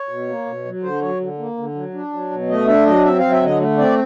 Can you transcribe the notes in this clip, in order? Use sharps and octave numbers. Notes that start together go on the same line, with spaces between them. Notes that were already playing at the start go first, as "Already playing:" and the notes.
Already playing: C#5
B2
A#3
B2
F#3
D3 C5
F#3 C#5
D3
A#3
D3
F#3
D4
F#3
B2
A3 D#5
D4 E5
F#3 D#5
C4 E5
F#3 F5
E5
D3 D#5
A3
C4 D5